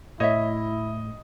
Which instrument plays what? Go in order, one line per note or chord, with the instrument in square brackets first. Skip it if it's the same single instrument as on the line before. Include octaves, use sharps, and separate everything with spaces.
[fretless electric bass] A2 [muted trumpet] E4 [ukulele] C#5 E5 [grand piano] D#5